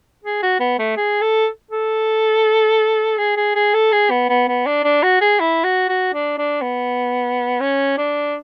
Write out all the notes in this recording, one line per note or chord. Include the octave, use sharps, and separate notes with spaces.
G#4
F#4
B3
A3
G#4
A4
A4
G#4
G#4
G#4
A4
G#4
B3
B3
B3
D4
D4
F#4
G#4
E4
F#4
F#4
D4
D4
B3
C#4
D4